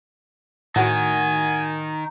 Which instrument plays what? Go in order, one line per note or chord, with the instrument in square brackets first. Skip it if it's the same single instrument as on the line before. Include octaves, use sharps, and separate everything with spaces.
[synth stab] A2 F#4 [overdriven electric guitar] D#3 [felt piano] F#5 [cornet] G#5